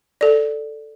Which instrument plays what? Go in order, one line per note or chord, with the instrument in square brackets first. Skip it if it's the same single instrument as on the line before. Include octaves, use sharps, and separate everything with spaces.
[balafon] A4 D5